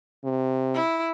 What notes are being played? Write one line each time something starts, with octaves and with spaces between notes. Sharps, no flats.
C3
E4